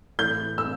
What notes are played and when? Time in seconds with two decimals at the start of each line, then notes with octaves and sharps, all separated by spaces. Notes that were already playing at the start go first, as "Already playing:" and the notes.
0.19 A2 E3 G6
0.58 E6